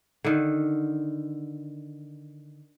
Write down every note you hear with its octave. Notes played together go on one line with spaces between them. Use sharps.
D3 D#3